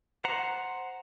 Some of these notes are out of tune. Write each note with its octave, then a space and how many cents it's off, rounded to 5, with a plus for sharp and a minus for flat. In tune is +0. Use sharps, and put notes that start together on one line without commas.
C5 +0 F#5 +0 A#5 +0